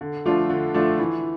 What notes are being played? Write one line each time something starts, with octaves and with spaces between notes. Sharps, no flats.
D3
F3 A3 D4 F4
D3
F3 A3 D4 F4
E3